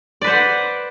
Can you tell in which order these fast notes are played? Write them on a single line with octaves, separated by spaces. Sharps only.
D5 B4 C5 F#5